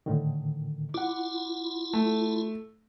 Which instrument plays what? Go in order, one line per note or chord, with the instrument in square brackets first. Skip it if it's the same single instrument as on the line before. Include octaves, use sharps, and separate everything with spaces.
[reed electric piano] A2 D3 D#3
[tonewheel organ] E4 F4 [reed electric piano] F#5 D6
[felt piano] A3